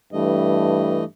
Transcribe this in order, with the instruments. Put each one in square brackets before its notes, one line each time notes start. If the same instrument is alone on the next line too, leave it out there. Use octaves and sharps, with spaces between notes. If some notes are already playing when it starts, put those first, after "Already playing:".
[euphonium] G2 [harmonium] E3 A3 D#5